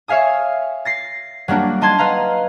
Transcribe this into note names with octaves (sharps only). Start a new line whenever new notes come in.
C#5 E5 F5 G#5 D#6
A6 A#6 C7
F#3 G3 A#3 D4 F#4
D4 D#4 A5 C6 G#6
B4 D#5 F5 A#5